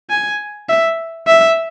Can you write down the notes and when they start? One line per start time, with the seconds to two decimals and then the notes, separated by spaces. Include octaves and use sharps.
0.10 G#5
0.69 E5
1.27 E5